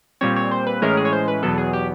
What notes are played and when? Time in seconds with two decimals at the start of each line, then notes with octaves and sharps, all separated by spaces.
0.21 A#2 G3 C4 C#5
0.36 C#5
0.51 C5
0.67 B4
0.82 A2 E3 G#3 C#4 A#4
0.97 G#4
1.05 C#5
1.13 C5
1.28 B4
1.43 E2 B2 F#3 B3 A4
1.58 G#4
1.73 G4